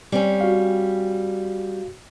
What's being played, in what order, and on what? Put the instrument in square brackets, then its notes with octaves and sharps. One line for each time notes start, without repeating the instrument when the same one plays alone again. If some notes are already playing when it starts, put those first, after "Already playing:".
[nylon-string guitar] G3 C4 C#4
[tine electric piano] F#4 F5